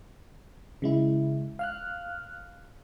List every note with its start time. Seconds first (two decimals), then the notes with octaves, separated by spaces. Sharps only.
0.82 C#3 G#3 E4
1.59 F5 F6 F#6